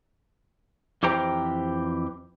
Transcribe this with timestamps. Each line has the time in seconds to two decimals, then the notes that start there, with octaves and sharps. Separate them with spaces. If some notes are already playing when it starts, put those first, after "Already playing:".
1.03 F2 E3 G4 C5 G5 A#5